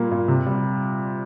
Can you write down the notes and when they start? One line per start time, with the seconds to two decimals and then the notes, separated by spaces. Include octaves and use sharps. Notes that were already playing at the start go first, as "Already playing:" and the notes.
Already playing: A#2 G3 A#3
0.11 A#2
0.28 C3
0.47 G3